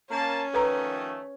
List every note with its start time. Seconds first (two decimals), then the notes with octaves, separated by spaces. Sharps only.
0.11 A#3 C#4 A5
0.54 D#3 F3 A3 A4 B4 A#5